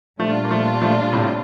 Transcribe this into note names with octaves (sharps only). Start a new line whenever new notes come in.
A#2 F3 G3 A3 D4 F4
A#3
F3 A3
F3 A3
A2 C3